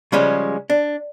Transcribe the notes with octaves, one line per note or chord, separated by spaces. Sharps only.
C#3 F3 G3 G#3 C#4
D4